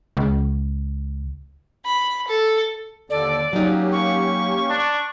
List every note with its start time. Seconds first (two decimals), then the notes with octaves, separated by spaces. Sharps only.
0.17 C#2
1.86 B5
2.28 A4
3.10 D#2 D3 A4 D5
3.53 F#3 A#3 C#4 D#4 G4
3.92 C#6
4.70 D4